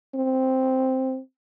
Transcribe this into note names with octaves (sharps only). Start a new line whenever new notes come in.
C4